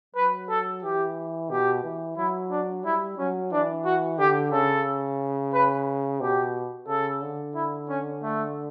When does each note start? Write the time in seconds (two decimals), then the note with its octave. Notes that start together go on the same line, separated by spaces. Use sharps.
0.15 F#3 B4
0.49 A4
0.83 E3 G4
1.50 B2 G4
1.83 E3
2.17 F#3 E4
2.51 D4
2.84 G3 E4
3.18 F#3 C#4
3.52 E3 D4
3.85 F#4
4.19 D3 G4
4.52 C#3 A4
5.53 B4
6.21 B2 G4
6.87 C#3 A4
7.22 D3
7.55 E4
7.89 C#4
8.22 A3